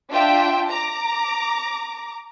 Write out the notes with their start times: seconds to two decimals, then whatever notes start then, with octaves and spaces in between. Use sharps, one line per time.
0.11 D4 F4 E5 G5
0.69 A#5 D6